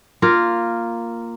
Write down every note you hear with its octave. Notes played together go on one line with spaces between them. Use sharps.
A#3 F4 A#4